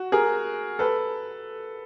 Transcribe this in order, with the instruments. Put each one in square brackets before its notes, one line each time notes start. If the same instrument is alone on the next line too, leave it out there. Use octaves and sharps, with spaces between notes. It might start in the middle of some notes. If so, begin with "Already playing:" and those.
Already playing: [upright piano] F#4
G#4 A#4
A4 B4